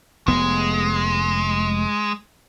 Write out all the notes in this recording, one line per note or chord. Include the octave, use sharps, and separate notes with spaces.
F1 G#3 B3